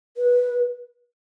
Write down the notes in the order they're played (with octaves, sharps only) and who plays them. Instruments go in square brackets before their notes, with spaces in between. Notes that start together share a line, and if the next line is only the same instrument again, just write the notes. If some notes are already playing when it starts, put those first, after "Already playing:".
[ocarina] B4